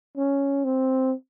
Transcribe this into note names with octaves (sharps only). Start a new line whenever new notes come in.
C#4
C4